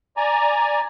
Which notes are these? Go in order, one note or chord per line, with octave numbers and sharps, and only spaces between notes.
D5 G#5 A#5